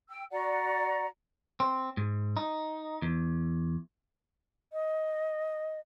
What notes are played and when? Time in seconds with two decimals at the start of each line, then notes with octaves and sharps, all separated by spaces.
0.09 G5 E6
0.32 F#4 D5 F#5 A#5
1.60 C4
1.97 G#2
2.37 D#4
3.02 E2
4.73 D#5